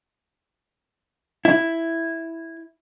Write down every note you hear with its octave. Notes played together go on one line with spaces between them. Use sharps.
E4